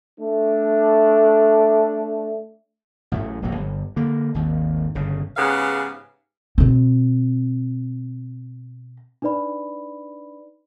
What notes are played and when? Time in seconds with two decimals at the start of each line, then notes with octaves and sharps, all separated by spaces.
0.20 A3 D4
3.12 A1 A2 F#3 A3
3.42 D#1 A#1 F#3
3.55 G1
3.96 D3 A#3
4.34 G#1 D#2
4.95 G1 C#3
5.37 G#2 C#3 B3 G4 B4 F5
6.58 B2 C4
9.22 D4 D#4 B4 D5 B5